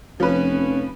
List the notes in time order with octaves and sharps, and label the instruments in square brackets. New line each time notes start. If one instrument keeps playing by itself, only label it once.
[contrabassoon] F1 [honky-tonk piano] F3 B4 [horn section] C#4